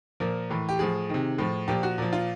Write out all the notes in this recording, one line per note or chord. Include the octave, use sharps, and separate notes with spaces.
A#2 F3 A#4
A2 E3
G4
A2 F3 G#4
C3 D#3
A2 F3
A#2 F3 G4
F#4
A#2 F3
F4